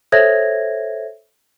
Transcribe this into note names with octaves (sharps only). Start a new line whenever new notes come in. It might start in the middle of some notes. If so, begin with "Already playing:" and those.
A4 C5 C#5 E5 G#6 A#6